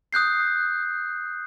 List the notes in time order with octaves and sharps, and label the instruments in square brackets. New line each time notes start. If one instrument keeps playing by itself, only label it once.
[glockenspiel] D#6 F#6 G6 C7